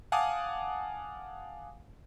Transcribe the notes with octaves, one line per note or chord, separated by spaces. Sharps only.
F5 F#5 G#5 A5 D6 D#6